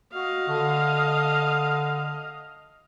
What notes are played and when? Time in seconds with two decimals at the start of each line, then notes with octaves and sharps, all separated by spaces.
0.13 F#4 D#5 F5
0.48 D3